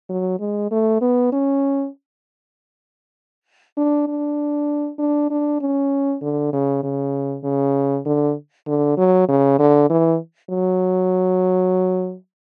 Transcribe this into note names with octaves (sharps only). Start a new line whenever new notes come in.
F#3
G#3
A3
B3
C#4
D4
D4
D4
D4
C#4
D3
C#3
C#3
C#3
D3
D3
F#3
C#3
D3
E3
F#3